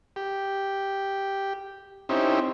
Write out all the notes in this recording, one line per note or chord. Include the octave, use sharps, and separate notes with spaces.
G4
C4 C#4 D#4 E4 G4